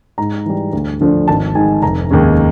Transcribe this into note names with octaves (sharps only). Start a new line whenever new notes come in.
G#2 A#5
E3 G3
D2
D3 F3 A3 D4
G#1 A5
G#2 D#3 G#3 G#5
F1 A#5
D#2 D#3 G#3 C#4